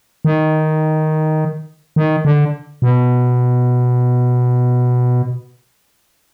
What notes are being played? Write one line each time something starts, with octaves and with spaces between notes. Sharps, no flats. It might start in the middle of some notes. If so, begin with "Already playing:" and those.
D#3
D#3
D3
B2